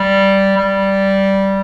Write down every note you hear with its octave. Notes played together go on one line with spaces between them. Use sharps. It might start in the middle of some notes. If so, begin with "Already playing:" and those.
Already playing: G3
G3